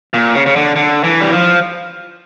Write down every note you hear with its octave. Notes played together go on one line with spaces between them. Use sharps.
A#2
C#3
C#3
D3
D3
E3
G3
F3